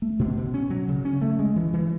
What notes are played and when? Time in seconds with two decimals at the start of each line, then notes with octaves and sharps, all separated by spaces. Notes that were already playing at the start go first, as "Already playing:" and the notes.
0.02 A3
0.19 B2
0.37 B2
0.54 C#4
0.70 F#3
0.89 C#3
1.05 C#4
1.22 A3
1.39 G#3
1.56 E3
1.73 E3